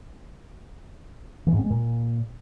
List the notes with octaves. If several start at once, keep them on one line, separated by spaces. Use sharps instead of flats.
E3
G#2
C4
G#3
A#2